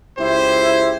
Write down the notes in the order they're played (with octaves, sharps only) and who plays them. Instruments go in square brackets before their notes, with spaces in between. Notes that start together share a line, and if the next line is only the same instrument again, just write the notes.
[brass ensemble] C#2 G4 C5 [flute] E4